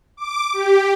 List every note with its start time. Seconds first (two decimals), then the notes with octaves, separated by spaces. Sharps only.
0.17 D6
0.53 G4